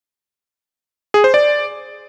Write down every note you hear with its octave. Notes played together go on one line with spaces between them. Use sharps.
G#4
C5
D5